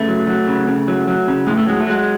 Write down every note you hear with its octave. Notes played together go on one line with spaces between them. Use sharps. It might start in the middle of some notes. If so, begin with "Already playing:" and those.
Already playing: C#3 A3
F#3
F#3
C#3
C#3
F#3
F#3
C#3
A2 G#3
A3
F#3 G#3
A3
F#3 G#3